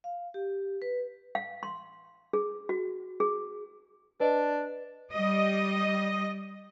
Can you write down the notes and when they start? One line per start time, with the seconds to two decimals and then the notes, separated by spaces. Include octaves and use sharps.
0.04 F5
0.34 G4
0.82 B4
1.35 F5
1.63 C6
2.33 G#4
2.69 F#4
3.20 G#4
4.20 D4 B4 D#5
5.12 G3 D#5